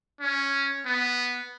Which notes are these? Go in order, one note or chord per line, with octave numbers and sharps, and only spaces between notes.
C#4
B3